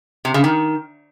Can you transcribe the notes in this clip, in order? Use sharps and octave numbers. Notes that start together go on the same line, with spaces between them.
C3
C#3
D#3